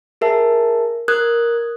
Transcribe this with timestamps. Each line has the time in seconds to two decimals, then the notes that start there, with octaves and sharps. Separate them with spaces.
0.21 G#4 A#4 E5 A5
1.08 A#4 D#6 F#6 G#6